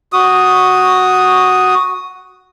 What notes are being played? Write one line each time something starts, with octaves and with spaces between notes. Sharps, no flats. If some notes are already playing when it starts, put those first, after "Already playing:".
F#4 D#6